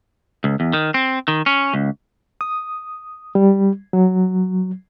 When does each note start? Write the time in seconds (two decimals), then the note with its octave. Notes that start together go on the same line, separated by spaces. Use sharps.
0.44 C#2
0.60 E2
0.73 D#3
0.94 C4
1.28 D#3
1.46 C#4
1.74 C#2
2.41 D#6
3.35 G3
3.93 F#3